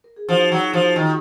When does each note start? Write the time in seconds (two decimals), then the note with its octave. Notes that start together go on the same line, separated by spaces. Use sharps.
0.04 A#4
0.16 G#4
0.29 F3 D#4 F#4
0.52 F#3 D#4
0.62 F4
0.73 F3
0.95 D#3 F4